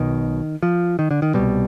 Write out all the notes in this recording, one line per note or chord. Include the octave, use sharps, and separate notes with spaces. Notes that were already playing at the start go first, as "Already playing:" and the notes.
Already playing: B1 B2 D#3
F3
D#3
D3
D#3
C2 B2 G3